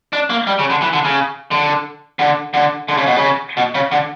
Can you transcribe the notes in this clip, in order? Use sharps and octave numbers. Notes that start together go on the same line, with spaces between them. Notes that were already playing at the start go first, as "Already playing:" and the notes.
D4
A#3
G3
C#3
D3
E3
D3
C#3
D3
D3
D3
D3
C#3
B2
C#3
B2
C#3
D3